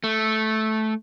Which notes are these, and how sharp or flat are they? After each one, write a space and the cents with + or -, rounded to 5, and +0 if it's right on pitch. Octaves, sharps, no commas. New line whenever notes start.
A3 -10